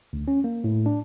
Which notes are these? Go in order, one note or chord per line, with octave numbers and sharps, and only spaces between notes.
D2
C#4
A#3
A2
D4